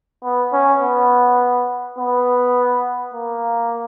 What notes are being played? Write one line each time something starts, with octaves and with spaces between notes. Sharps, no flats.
B3
C#4
B3
B3
A#3